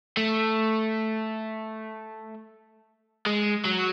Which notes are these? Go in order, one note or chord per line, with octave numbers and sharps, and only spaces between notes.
A3
G#3
F#3